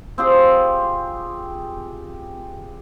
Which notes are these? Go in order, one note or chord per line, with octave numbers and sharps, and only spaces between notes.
C4 F4 G4 G#4